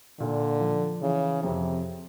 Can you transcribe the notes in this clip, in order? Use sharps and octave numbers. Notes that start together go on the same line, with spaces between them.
A#2 D3
F3
C#3 E3
F2 C3